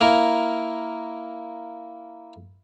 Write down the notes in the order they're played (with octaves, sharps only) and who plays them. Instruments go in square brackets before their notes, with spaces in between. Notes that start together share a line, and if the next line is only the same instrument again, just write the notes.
[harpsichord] A#3 E4 A#4